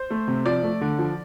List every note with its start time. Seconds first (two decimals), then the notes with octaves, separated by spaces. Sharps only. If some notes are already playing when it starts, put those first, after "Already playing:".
Already playing: C5
0.10 A3
0.28 C3
0.46 F3 D5
0.63 A3
0.81 D3
0.99 F3